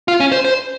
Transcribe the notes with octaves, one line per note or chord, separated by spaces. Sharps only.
F4
C#4
C5
C5